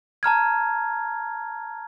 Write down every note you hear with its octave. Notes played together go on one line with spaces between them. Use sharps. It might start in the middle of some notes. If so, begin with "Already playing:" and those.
A5 A#5 F6 G#6